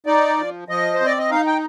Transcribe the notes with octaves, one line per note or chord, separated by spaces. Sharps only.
D#4 D5
F3
F3 D#5
C5
C4
D5
D#5
D#4 F5
G5